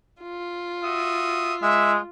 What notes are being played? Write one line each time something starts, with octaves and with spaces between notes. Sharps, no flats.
F4
F#4 E5 D#6
G#3 E5